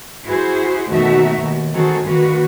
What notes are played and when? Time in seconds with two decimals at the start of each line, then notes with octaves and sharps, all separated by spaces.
0.24 E4 F#4 G#4 C5
0.89 D#2 B2 A3 D#4 F#4 E5
1.40 D#2
1.73 D#3 C4 F#4 G#4 A4
2.05 D3 D#3 A#3 F#4 B4